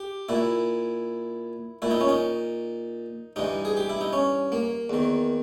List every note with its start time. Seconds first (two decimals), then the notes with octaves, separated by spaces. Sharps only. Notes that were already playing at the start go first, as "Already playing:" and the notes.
Already playing: G4
0.29 A#2 E4
1.82 A#2 E4
1.91 D#4
2.01 C#4
2.09 D#4
3.36 G2 E3 D#4
3.65 G#4
3.77 G4
3.89 E4
4.01 D#4
4.13 C#4
4.52 A#3
4.90 E2 D#3